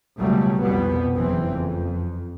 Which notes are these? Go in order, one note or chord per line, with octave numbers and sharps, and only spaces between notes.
C#2 B2 F#3 G3 A3
C2 F2 B2 G3 B3
F#1 E3 C4
F2